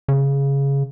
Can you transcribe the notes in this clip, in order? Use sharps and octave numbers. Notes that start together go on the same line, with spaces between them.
C#3